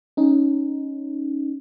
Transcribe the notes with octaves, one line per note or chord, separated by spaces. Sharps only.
C#4 D#4